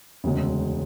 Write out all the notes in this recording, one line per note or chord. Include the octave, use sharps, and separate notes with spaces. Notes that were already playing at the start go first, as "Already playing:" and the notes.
E1 D2 C#3 G#3